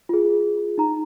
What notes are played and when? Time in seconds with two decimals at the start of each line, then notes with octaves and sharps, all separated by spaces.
0.09 F4 G#4
0.78 D#4 A#5